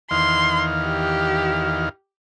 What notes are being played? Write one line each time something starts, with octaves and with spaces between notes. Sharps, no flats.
E2 D#3 F5 C6
G4